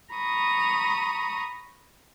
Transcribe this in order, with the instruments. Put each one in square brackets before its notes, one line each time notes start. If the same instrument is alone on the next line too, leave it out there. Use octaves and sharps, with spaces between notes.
[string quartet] A#5 B5 C#6 D#6